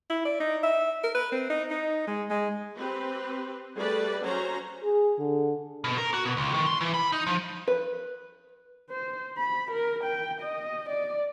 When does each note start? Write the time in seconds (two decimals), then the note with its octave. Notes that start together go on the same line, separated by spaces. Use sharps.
0.10 E4
0.25 D5
0.40 D#4
0.63 E5
1.04 A#4
1.15 B4
1.32 C4
1.50 D#4
1.71 D#4
2.07 G#3
2.30 G#3
2.77 C4 G4 B4
3.75 G3 A3 G#4 B4 D5
4.22 F#3 C#4 C5 A#5
4.83 G#4
5.18 D3
5.84 B2
5.98 A#4
6.14 F#4
6.25 B2
6.37 C#2
6.54 D#3
6.66 C6
6.81 E3
6.94 B5
7.12 D#4
7.27 F3
7.68 B4
8.90 C5
9.37 B5
9.72 A#4
10.04 G5
10.41 D#5
10.89 D5